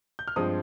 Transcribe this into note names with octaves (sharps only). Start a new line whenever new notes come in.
G6
F6
G2 F3 G#3 C4 D#6